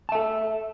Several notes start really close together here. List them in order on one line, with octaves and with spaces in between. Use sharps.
A5 E5 A4